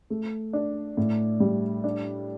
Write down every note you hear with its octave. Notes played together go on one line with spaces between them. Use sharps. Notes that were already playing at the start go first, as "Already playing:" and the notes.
A3
D4
A2
G3
D4